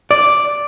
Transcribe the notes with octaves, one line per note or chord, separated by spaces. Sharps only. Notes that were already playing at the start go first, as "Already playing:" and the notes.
D5